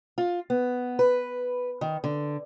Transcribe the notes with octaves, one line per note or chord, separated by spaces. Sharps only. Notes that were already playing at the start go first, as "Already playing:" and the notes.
F4
B3
B4
D#3
D3